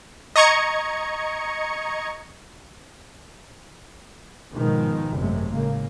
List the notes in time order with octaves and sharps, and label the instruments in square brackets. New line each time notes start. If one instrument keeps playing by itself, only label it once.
[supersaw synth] D#5 A#5 C#6 G#6 C#7
[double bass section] G#2 B2 D#3 F3 G#3
G#1 F#2 C3 F#3 G#3 A3
A2 C#3 A#3